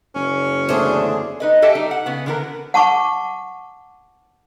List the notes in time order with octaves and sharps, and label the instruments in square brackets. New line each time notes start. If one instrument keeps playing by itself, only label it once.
[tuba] F#1 [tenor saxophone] C#4
[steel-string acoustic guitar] E2 A3 C5 [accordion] D3 D4 G#4
[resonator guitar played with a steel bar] D#4 B4 D#5
G4 A4 D#5 E5 G5 A5
G3 D#4
F#5
C#3 B3
D3 E3 B3 G#4 A#4
[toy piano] F#5 A5 C#6 D6